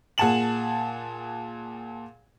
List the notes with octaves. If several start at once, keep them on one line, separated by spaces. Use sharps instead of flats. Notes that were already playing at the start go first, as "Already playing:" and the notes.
A#2 G#4 F#5 A5 E7 F#7